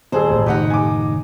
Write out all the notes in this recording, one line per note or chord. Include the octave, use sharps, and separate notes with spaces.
D#1 G#4 C5 E6
G#1 A2 A3
F#1 A2 D#3 D#4 G4 C#5 D#5 F#5
G#5 D6